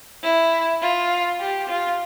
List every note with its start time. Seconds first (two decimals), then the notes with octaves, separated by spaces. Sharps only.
0.24 E4
0.82 F4
1.40 G4
1.69 F4